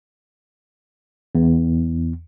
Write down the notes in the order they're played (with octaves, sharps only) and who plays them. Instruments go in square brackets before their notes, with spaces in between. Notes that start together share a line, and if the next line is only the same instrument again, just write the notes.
[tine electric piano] E2